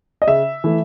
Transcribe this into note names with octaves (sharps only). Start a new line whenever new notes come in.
D#5
C#3 E5
E3 A3